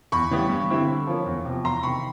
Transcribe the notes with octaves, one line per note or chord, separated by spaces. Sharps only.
E2 B5 C#6
C#3 E3 G3 B3
G2
D3 G3 C4 E4
D3
F3 A#3 C#4
E2
C3 F3
E2 A#5 C6
C3 D#3 B5 C#6